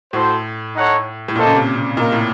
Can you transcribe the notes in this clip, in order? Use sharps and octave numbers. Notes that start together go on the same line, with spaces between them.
A2 F#4 A4 C5
D#4 A4 C#5 F#5
A2
A#2 A#3 C#4 A4 C5 D#5
C#3
C3
C3
A#2 D#4 A#4 F5
A2